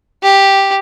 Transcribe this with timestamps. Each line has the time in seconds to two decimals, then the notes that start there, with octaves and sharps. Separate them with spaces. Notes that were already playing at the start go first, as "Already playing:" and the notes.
0.23 G4